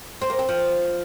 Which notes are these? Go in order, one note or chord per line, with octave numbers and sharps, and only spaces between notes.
C4
A#3
C4
F3